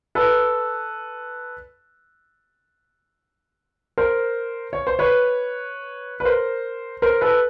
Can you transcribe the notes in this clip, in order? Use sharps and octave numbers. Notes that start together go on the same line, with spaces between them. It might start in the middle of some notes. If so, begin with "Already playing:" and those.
A4 B4
A#4 C5
C#5
C5
B4 C#5
B4
A#4 C5
A#4 C5
A4 B4